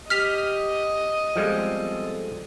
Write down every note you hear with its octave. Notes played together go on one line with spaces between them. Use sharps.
G4 D#5 F6 B6 F7
F3 G3 G#3 B3 C4 A4